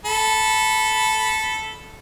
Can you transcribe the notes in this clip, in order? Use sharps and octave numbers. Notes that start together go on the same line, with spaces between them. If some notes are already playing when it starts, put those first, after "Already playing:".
A4 B5